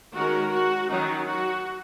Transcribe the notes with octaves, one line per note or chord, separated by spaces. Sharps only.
D#3 G#3 C#4 F#4 A#4
F#4
D#3 F#3 C#4 D#4
F#4